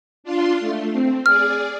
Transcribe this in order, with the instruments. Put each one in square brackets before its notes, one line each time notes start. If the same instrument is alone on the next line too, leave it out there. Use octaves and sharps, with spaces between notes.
[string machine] D4 F4 C6
A3
C4
[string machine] G#4 D5 [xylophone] F6